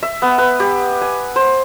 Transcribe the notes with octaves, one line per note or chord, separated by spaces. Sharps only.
E5
B3
B4
G4
G#5
C5